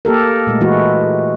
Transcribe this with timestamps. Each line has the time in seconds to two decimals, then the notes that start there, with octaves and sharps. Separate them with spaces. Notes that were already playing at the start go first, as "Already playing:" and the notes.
0.05 A#3 G4 A4 A#4
0.47 A#2 G#3 A3
0.61 E3 G#3 E4 F#4